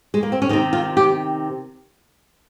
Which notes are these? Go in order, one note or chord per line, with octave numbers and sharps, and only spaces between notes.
G#3
A#3
C4
C#4
C3 D#3 D#4
F4
G4